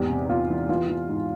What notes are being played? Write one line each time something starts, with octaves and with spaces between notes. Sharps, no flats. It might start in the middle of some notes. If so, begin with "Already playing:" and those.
Already playing: E2 G#2 G4
C3
E2 F4
E3
E3 F4
E3
G#2